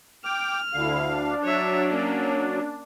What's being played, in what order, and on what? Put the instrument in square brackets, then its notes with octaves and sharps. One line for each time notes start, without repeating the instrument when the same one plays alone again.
[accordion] G5 D6 [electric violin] F6
[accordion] D2 F5 [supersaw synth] D3 E4
[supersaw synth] D4
[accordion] F#3 [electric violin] C#5 E5
[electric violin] A#3 C#4